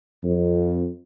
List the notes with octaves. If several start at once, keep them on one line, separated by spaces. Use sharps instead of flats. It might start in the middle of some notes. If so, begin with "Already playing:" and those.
F2